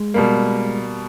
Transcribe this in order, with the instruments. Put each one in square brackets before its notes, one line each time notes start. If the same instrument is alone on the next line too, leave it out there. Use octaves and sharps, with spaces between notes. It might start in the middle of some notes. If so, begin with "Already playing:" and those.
Already playing: [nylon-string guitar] G#3
[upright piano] B2 G3 A#3